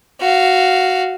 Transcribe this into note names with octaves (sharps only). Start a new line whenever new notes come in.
F#4 F5